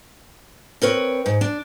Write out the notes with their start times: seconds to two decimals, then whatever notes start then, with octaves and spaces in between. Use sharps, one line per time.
0.82 C4 A#4 B4 C#5
1.26 G#2
1.41 D4